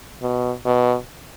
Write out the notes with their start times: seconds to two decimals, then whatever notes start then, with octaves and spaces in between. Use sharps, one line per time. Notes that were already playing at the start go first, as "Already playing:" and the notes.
0.22 B2
0.65 B2